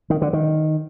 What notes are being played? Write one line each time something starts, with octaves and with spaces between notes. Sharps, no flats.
D#3
D3
D#3